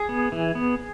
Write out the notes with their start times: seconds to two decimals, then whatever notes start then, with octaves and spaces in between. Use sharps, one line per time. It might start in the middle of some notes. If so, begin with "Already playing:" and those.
Already playing: G#4
0.09 B3
0.32 E3
0.55 B3